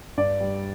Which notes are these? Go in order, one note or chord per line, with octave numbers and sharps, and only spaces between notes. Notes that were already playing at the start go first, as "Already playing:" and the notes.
G2 D5
G3